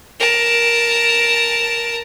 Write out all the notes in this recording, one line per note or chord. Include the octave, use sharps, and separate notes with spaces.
A#4 A5